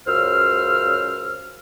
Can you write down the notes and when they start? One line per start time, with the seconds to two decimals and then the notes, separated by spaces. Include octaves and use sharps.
0.07 C#2 F#2 C#3 C5 E6 F6